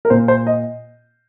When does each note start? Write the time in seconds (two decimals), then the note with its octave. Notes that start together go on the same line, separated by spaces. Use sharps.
0.05 A#4
0.10 A#2 C5
0.28 C5
0.47 D#5